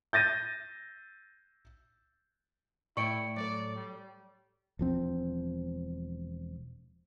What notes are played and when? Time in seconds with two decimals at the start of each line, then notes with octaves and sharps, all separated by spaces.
0.13 G6 A6 A#6 D#7
2.97 A2 E4 D5 G5 C#6 C#7 D7
3.36 F#3 A4 D5
3.76 G3
4.79 E1 F3 C4